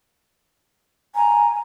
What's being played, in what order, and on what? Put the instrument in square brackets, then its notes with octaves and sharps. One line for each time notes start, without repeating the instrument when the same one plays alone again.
[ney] G#5 [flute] A#5